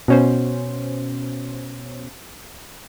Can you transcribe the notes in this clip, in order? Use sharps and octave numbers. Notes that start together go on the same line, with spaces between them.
B2 C#4 C5